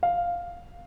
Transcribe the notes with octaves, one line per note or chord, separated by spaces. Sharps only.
F5